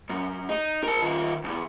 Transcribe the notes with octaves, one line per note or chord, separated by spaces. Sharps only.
F#2
D#4
A#4 A5
D#3 F4
B1 E2